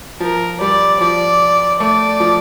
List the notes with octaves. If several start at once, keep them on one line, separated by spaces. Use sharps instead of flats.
F3 A#4
G3 D5
F3 D5
A3 D5
F3